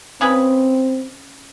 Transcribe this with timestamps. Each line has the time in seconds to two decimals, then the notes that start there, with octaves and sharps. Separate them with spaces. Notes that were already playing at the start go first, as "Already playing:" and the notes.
0.21 C#3 C4 G#4 B4